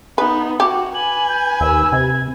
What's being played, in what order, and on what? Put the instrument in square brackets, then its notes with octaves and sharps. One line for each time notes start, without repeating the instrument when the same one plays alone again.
[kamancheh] B3 D#4 [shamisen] B4
[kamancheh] F#4 [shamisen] G4
[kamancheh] B4 G#5 [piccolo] F#7
[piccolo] G6
[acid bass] D#2 [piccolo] E6
[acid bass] C3 [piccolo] G#6